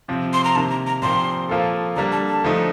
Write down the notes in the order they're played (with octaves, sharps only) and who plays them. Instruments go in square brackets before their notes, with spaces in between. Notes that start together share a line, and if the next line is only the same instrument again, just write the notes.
[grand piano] C3 F3 C4
[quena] C6
A#5
[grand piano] C3 D#3 A#3 [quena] A5
[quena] A#5
A#5
[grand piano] A#2 F3 C4 G4 A#4 [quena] C6
[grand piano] F3 A#3 F4 A4
[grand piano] D3 G3 A#3 [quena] A#5
[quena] A5
A5
[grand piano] D3 F3 A3 D#4